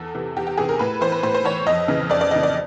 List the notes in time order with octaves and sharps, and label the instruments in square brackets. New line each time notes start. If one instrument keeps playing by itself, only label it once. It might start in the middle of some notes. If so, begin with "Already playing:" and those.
Already playing: [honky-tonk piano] E2 A4
C3 E3
E2 G4
G4
C3 E3 G#4
A#4
A2 B4
E3 C5
B4
A2 C5
C5
E3 C#5
F2 D#5
C#3 E3
F2 D5
D5
C#3 E3 D#5
D5